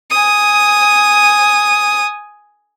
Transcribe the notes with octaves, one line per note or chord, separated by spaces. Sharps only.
G#5 D#6